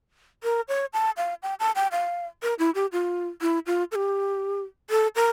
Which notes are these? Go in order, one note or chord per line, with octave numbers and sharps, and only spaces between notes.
A#4
C#5
A5
F5
G5
A5
G5
F5
A#4
E4
G4
F4
E4
F4
A4
G4
A4
A#4